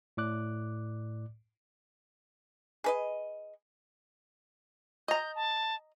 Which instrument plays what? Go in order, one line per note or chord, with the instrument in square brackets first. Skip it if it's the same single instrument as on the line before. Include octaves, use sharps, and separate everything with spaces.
[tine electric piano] A2 D5 D6 F#6
[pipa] G#4 B4 D#5
[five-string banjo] D#5 A#5 [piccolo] G6
[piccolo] A5